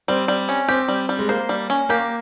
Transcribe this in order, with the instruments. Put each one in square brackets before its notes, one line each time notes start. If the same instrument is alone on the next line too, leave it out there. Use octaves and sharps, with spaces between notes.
[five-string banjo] G3 [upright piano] C4
[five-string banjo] G3
C#4
[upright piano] C4 [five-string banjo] G4
[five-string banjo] G3
G3
[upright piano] G#3
[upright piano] A#3 [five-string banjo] C5
[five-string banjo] G3
C#4
[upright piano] A#3 [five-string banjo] G4